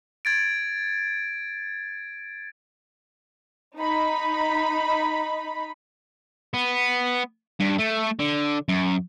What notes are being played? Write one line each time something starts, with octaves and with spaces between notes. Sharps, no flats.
G#6 A6 D7
D#4 B5
B3
G2
A3
D3
F#2